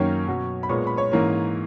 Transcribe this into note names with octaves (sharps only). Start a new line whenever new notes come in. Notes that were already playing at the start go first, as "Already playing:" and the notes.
Already playing: F#2 D#3 A#3 C#4 C#5 C#6
B2 F#3 C#4
B5
A#2 G#3 B3 C#5 C#6
B5
C#5 C#6
G#2 E3 A#3 C#4